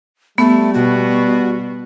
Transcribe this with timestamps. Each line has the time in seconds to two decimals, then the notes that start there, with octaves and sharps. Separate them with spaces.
0.38 G3 A3 B3
0.74 B2 F#4